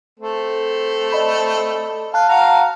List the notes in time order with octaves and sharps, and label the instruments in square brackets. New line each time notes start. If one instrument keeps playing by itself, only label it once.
[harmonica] A3 C4 A4
[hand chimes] D5 D#5 B5
[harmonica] F5 [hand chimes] A5 F#6
[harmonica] F#4 F5 A#5